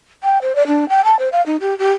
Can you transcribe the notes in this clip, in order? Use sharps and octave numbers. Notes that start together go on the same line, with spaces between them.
G5
C5
D5
D4
G5
A5
C5
F5
D#4
G4
G4